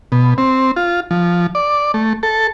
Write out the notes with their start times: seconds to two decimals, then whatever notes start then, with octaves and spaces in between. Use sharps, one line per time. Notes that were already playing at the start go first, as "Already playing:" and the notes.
0.12 B2
0.38 C4
0.76 F4
1.11 F3
1.55 D5
1.94 A3
2.23 A4